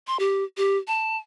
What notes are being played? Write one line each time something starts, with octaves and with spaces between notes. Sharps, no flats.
C6
G4
G4
A5